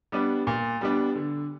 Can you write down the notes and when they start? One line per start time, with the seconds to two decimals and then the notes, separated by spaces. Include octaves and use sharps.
0.12 G3 B3 D4
0.47 A#2
0.81 G3 B3 D4
1.15 D3